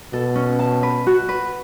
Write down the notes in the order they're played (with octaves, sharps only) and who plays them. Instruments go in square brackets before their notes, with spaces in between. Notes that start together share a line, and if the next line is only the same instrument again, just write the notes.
[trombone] B2 [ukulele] A4
[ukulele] C#4
A5
B4
F#4
B4